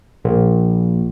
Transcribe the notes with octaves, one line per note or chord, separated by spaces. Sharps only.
A#1